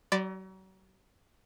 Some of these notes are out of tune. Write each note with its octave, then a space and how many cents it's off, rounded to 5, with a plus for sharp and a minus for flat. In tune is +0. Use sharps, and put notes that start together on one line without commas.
F#3 +40 D5 +0 B5 +40